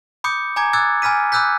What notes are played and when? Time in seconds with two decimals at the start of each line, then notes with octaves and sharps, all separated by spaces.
0.24 B5 D6 D#6 G6 C#7
0.56 G#5 A#5 D6 G#6
0.73 D6 E6 F#6 G#6 A6
1.02 G#5 B5 F6 B6 D#7
1.32 B5 D6 E6 F#6 G6 B6